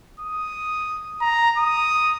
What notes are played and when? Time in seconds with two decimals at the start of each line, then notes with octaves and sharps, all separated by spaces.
0.20 D#6
1.21 A#5
1.58 D#6